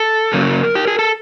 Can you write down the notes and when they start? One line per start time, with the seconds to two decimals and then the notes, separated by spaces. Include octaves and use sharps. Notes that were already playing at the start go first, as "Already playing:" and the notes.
Already playing: A4
0.33 F#2 C#3 F#3 A#3 C#4 A#4
0.75 G4
0.87 G#4
0.99 A4